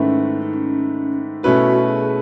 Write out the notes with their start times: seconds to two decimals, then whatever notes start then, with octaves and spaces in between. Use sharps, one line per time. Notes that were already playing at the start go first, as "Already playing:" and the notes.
Already playing: G#2 D#3 A3 C#4 E4 B4
0.42 D#4
0.53 C#4
1.43 B2 A3 C#4 E4 F#4 B4
1.89 G#4